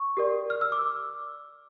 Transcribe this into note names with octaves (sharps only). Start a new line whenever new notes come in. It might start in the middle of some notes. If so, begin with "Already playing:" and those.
Already playing: C#6
G4 A#4 D5
F6
E6
D6